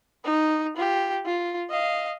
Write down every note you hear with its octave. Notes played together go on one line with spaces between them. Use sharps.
D#4
F4 G4
F4
D#5 F5